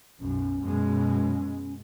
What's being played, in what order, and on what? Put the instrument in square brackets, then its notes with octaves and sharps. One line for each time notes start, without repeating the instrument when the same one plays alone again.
[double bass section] B1 F#2 [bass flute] C#4
[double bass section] F#2 B2 G#3